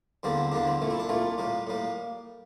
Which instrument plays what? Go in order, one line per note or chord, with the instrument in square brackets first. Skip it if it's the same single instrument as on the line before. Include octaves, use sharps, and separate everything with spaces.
[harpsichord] E2 D3 G3 A#3 C4
E2 D3 G3 A#3 D4
C4
C2 A#2 A3
E4
D4
C2 A#2 A3 F4
A2 G3 A#3
A2 G3 A#3